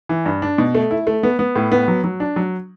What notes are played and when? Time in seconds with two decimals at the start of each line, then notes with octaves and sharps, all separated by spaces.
0.09 E3
0.26 G2
0.42 D4
0.58 B2
0.75 A3
0.91 E4
1.07 A3
1.23 B3
1.39 B3
1.56 A2
1.72 B3
1.88 F#3
2.04 F#3
2.20 D4
2.36 F#3